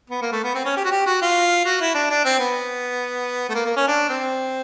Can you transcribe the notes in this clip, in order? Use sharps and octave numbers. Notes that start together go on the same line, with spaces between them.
B3
A#3
A3
B3
C4
C#4
G4
F#4
G4
F#4
F4
F#4
E4
D4
D4
C4
B3
A3
A#3
A#3
C#4
D4
C4